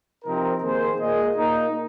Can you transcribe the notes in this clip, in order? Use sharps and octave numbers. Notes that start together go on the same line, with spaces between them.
C3 F3 C4 D#4 A#4
D#3 A#3 G#4 C5
A#2 A#3 G#4 D#5
A#2 A#3 D#4